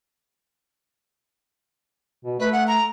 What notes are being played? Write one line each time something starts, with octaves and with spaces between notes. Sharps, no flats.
B2
A3 B4
F#5
A#5